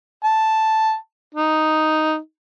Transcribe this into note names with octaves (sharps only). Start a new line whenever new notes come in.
A5
D#4